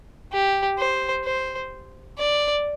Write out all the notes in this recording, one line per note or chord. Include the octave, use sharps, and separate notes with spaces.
G4
C5
C5
D5